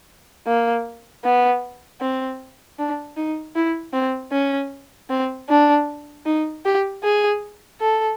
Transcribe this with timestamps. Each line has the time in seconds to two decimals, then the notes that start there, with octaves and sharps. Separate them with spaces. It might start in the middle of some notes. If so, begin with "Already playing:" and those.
0.47 A#3
1.24 B3
2.01 C4
2.79 D4
3.16 D#4
3.56 E4
3.93 C4
4.32 C#4
5.10 C4
5.49 D4
6.26 D#4
6.65 G4
7.03 G#4
7.80 A4